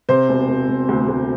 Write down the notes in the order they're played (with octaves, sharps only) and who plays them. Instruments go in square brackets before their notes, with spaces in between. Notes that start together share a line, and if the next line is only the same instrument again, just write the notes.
[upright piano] C3 C5
E1
E1
E1
D2
D2